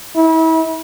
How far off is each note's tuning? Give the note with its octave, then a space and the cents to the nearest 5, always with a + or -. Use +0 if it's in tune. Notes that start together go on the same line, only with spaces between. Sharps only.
E4 -35